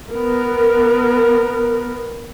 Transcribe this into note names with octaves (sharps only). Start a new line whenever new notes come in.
B3 A#4